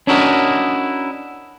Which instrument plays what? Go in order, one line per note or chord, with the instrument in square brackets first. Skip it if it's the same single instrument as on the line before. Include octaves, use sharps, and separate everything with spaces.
[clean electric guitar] C#4 D4 E4 F#4 A#4 D#5